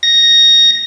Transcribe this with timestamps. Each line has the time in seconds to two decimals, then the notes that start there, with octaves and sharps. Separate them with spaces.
0.03 A#6